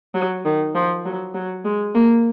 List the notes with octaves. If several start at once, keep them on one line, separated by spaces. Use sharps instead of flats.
F#3
D#3
F3
F#3
F#3
G#3
A#3